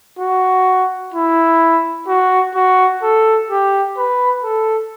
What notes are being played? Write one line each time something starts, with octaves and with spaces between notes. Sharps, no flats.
F#4
E4
F#4
F#4
A4
G4
B4
A4